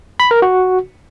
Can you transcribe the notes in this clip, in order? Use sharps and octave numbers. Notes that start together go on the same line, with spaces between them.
B5
A#4
F#4